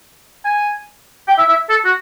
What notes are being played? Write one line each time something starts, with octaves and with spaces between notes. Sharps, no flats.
G#5
G5
E5
E5
A4
F#4